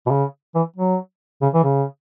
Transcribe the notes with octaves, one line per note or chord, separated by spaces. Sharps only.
B2
C#3
E3
F#3
C#3
E3
C#3